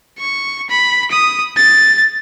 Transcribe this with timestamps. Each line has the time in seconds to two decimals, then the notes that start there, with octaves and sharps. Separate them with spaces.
0.19 C#6
0.70 B5
1.11 D#6
1.57 A6